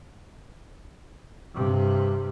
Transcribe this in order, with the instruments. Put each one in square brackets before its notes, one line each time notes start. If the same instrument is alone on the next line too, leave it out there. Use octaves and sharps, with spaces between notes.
[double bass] G2 C3